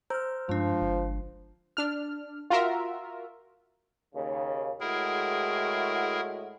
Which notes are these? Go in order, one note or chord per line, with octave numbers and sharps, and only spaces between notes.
C5 A#5 E6 F6 G6
G2 F3 G#3 D4
G1
D4 F6
F4 F#4 A#4 E5
D#2 C#3
A2 G#3 E4 F#4 G#4 A#4